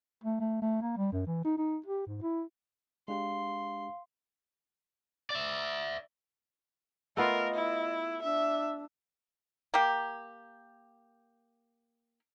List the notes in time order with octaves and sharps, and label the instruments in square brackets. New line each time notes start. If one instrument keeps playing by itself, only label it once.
[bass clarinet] A3
A3
A3
A#3
G3
F#2
E3
D#4
D#4
G4
G#2
E4
[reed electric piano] G#3 D4 G4 [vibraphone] F5 [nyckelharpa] C6
[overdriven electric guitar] D5 E5
[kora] A3 B3 F4 [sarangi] A#4 [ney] D#5
[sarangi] E4
[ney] D4 [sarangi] E5
[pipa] A#3 G4